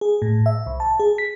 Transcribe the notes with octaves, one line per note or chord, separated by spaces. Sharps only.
G#4
A2
E5
C2
A5
G#4
B6